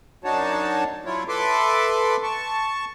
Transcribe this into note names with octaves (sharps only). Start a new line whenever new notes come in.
F#2 D4 D#4 F#4 C#5 A5
F#3 E4 F4 C#5
A4 B4 E5 C6 D6
A5 C#6